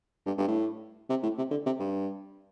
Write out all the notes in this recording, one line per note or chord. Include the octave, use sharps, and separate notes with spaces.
G2
G2
A2
C3
A2
C3
D3
C3
G2